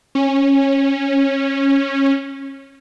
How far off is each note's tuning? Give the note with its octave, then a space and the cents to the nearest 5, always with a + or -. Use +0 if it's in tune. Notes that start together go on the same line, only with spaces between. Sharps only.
C#4 -15